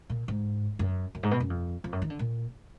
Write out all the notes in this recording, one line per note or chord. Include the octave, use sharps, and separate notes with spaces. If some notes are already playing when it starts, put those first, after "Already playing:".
A#2
G#2
F#2
F#2
G#2
B2
F#2
F2
F2
F#2
D#3
D3
A#2